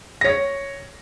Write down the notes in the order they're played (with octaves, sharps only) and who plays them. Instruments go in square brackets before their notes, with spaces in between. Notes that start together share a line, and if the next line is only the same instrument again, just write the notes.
[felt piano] C#5 A#6